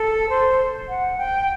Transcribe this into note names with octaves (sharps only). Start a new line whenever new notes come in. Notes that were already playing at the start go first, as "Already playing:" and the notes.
Already playing: A4
C5
F#5
G5